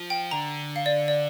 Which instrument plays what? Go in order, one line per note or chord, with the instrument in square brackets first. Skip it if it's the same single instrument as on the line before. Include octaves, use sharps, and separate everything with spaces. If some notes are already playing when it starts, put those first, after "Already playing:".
Already playing: [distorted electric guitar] F3
[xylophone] G5
[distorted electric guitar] D3 [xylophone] A#5
[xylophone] F5
D5
D5